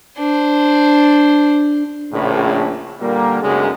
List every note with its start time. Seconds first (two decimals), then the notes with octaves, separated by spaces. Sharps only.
0.17 D4 C5
2.12 A#1 A2 C#3
3.01 A#2 D3 G3 A#3
3.42 B1 F#2 C#3 G#3 D4 G#4